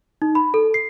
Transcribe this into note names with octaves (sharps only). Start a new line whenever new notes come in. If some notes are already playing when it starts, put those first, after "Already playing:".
D#4
B5
A4
C7